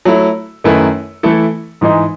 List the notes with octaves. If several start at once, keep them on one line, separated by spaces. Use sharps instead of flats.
F#3 A3 E4
F#2 D#3 A3 E4 B4
E3 A3 E4 A4
G#2 E3 G#3 D#4